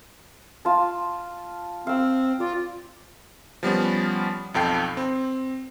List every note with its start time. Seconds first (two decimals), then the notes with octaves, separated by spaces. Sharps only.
0.65 F4 A5
1.87 C4 F5 E6
2.40 F4 D5
3.63 F3 G3 B3 C#4
4.54 B1 F2 A4 G5 C7
4.97 C4